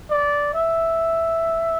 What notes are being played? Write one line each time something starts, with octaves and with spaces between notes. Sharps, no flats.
D5
E5